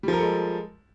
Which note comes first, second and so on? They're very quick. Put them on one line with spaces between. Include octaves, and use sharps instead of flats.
G3 F3 A#4 A4 G#3